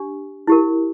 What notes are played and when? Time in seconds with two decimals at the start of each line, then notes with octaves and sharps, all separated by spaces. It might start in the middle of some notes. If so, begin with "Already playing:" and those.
Already playing: D4 G4
0.47 E4 G4 A#4